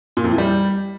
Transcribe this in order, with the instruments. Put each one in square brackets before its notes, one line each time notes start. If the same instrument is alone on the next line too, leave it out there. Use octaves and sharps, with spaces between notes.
[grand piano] A#2
F2
E3
G3